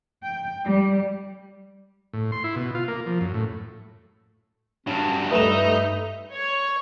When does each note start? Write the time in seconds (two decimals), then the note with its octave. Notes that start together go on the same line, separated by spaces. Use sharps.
0.23 G5
0.64 G3
2.13 A2
2.32 C6
2.44 E4
2.56 B2
2.75 F4
2.88 A#3
3.06 F3
3.21 F#2
3.34 A2
4.87 G2 F#3 C#4 D4
5.31 G2 A3 D#4 B4 E5 E7
6.32 C#5